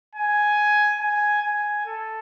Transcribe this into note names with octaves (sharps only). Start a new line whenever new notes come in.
G#5
G#5
G#5
A4